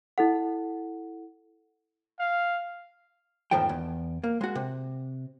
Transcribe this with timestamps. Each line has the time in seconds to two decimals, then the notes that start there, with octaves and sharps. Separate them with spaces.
0.18 E4 A4 F#5
2.19 F5
3.51 E2 G#2 D#3 F3 A3 G5
3.69 E2
4.24 A#3
4.41 G#3 F#4
4.55 C3